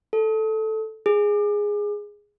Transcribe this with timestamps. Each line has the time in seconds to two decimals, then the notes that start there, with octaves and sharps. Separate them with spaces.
0.13 A4
1.06 G#4